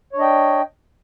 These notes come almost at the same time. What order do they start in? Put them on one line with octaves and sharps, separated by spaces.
C#5 D4 D#5 G5